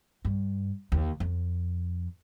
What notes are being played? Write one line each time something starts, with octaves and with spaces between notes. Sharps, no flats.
G2
D#2
F2